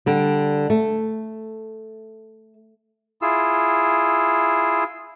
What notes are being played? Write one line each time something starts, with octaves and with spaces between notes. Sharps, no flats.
D3 G3
A3
E4 F4 G#4 E6